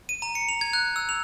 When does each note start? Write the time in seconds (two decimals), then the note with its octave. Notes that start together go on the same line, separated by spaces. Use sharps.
0.09 D#7
0.22 A#5
0.35 C#7
0.49 F7
0.61 G#6
0.73 F#6
0.96 E6
1.09 F7